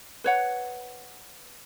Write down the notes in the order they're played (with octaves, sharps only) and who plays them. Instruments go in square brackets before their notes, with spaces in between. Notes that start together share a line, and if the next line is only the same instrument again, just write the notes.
[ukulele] B4 C#5 F#5